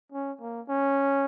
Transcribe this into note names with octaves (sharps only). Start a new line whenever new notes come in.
C#4
A#3
C#4